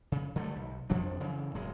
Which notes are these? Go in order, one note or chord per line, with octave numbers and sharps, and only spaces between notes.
C#3
D3 F#3 G3 A3
B1
F2 F3 F#3 D4
C#3 E3
D1 F#2 G#3